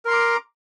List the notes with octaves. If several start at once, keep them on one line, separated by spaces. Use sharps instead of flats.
A#4 A#5 C6 D6